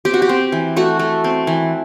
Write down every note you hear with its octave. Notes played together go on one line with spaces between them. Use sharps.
C4 G4
F#4
G4
C4
E3
A3 F#4
A3
C4
E3